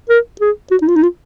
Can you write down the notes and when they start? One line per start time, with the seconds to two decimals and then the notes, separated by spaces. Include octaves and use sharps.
0.09 A#4
0.41 G#4
0.71 F#4
0.82 D#4
0.88 F4
0.96 D#4
1.03 F4